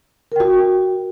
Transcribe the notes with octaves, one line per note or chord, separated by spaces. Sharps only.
F#4 A#4 G5